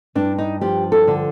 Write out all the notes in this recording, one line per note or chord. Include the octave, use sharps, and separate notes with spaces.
G2 D4
D#4
F3 G4
A4
D3